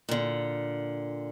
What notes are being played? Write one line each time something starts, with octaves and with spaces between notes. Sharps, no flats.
A#2 D3